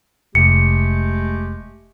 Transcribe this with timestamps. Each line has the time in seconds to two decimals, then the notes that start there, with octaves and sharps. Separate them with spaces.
0.35 F1 G#3 A3 G4 C#7